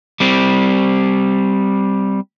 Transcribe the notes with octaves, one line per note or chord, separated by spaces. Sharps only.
G3 C4